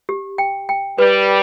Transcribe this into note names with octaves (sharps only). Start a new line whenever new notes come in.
G4
G5
G5
G3 B4